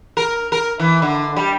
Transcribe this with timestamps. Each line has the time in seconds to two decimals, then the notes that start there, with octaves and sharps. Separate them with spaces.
0.17 A#4
0.52 A#4
0.80 E3
1.02 D3
1.37 G3